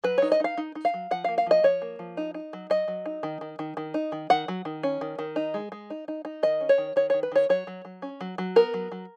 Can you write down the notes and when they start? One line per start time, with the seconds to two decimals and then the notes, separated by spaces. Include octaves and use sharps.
0.04 F#3 B4
0.18 D#4 C#5
0.32 D#5
0.40 D#4 F5
0.57 D#4
0.75 D#4
0.85 F5
0.94 F#3
1.11 F3 F#5
1.24 A#3 F5
1.38 F5
1.46 F3 D#5
1.63 F3 C#5
1.82 A#3
1.99 F3
2.17 D#4
2.34 D#4
2.53 F#3
2.70 F#3 D#5
2.88 F#3
3.06 D#4
3.23 D#3
3.41 D#3
3.59 D#3
3.77 D#3
3.94 D#4
4.12 D#3
4.30 D#3 F#5
4.48 F#3
4.65 D#3
4.83 C#4
5.01 D#3
5.19 D#3
5.36 D#4
5.54 G#3
5.72 G#3
5.90 D#4
6.08 D#4
6.25 D#4
6.43 D#3 D#5
6.61 C#4
6.69 C#5
6.78 D#3
6.96 D#3 C#5
7.10 D#3 C#5
7.23 B4
7.32 D#3 C#5
7.49 F#3 C#5
7.67 F#3
7.85 F#3
8.02 C#4
8.21 F#3
8.38 F#3
8.56 B3 A#4
8.74 F#3
8.92 F#3